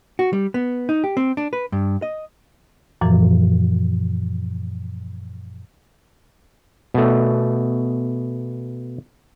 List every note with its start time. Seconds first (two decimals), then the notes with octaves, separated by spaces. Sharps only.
0.19 F#4
0.33 G3
0.54 B3
0.89 D#4
1.04 G4
1.17 C4
1.37 D4
1.53 B4
1.72 G2
2.02 D#5
3.01 F#2 A#2 E3 F3
6.94 B2 A3